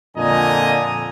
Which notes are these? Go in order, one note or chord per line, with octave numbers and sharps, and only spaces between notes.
F2 A#2 D3 D#5 G#5 A#5